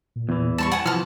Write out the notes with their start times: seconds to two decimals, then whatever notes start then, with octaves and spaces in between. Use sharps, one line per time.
0.16 A#2
0.29 E2 E3
0.58 G3 A5 C6 C#6
0.72 F#5 G#5 A5
0.86 C3 E3 F3 A5 F6